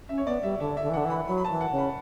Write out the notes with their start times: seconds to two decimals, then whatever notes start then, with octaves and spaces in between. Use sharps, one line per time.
0.09 C#4 E5
0.18 C#5
0.27 B3 D5
0.43 G3 E5
0.60 D3 E5
0.77 E5
0.83 D3
0.90 E3
0.93 F#5
0.97 D3
1.05 E3 B5
1.27 F#3 B5
1.38 B5
1.45 A5
1.50 E3
1.61 F#5
1.72 C#3
1.78 B5